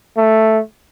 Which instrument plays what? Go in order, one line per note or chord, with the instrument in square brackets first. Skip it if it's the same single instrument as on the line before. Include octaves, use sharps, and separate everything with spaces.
[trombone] A3